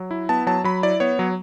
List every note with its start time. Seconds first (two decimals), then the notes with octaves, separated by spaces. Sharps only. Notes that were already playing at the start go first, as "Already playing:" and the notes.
Already playing: F#3
0.11 E4
0.29 B3 A5
0.47 F#3 A5
0.64 F#3 B5
0.83 E4 D5
1.00 B3 C#5
1.19 F#3